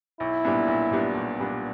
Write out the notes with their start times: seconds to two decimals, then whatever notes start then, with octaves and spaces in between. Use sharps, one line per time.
0.20 B1 E4
0.45 A#2 G3 B3 D4
0.68 B1
0.91 A#2 G3 B3 D4
1.15 B1
1.39 A#2 G3 B3 D4